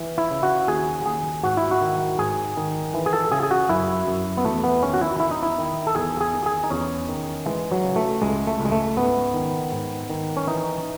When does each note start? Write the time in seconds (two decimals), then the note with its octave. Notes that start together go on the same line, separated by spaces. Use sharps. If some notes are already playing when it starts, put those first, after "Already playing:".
Already playing: E3
0.18 E4
0.31 C#3
0.43 F#4
0.68 D#2 G#4
1.06 D#2 G#4
1.44 G#2 F#4
1.57 E4
1.71 F#4
1.81 D#3
2.19 G#2 G#4
2.57 D#3
2.94 E3
3.06 G#4
3.13 A4
3.32 C#3 G#4
3.43 G#4
3.51 F#4
3.69 F#2 E4
4.07 F#2
4.37 B3
4.45 E2 A3
4.64 B3
4.83 D#3 C#4
4.94 F#4
5.01 E4
5.20 E2 E4
5.31 D#4
5.43 E4
5.58 D#3
5.87 A4
5.95 E2 G#4
6.21 G#4
6.33 D#3
6.46 G#4
6.64 D#4
6.70 E2 C#4
7.08 D#3
7.46 E3 G#3
7.72 F#3
7.84 C#3
7.96 A3
8.22 C#2 G#3
8.47 A3
8.59 C#2
8.65 G#3
8.72 A3
8.97 G#2 B3
9.34 D#3
9.72 G#2
10.10 D#3
10.37 C#4
10.47 E3 D#4